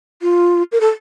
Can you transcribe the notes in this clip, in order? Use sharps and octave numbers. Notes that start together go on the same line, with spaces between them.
F4
A#4
A4